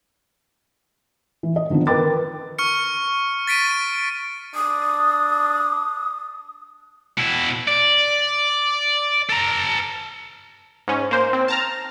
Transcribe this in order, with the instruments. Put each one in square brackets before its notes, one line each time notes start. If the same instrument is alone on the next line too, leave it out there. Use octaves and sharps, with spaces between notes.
[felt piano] E3
D#5
D3 D#3 F3 B3 D4
A#4 B4 G5 D6 A6
[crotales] C#6 F6 C#7
A6 B6 D7 D#7
[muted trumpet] D4 [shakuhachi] D#6
[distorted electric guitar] B2 E4
D5
A4 A#5
[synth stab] G#2 C#4
A#3 C5
C4
A5 A#5 F6